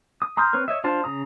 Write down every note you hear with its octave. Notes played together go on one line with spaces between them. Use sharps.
D#6
A#5 C6 D#6 F6 G6
C4 B4 C#5 F6
C#5 D#5 E5
D4 F4 C5 A5
C#3 A#5 D#6